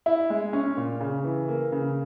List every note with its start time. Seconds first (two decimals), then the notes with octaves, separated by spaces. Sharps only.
0.06 E4
0.30 G#3
0.53 C#4
0.77 A#2
1.00 C#3
1.24 E3
1.48 A#3
1.72 C#3